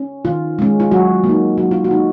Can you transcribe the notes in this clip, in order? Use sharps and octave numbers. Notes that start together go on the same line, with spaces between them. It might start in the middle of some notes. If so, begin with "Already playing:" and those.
Already playing: C#4
D#3 F4
G#3 C#4
F4
F#3 F#4
A#3
D#4
F#3 F#4
F4
F#4
A#3 D#4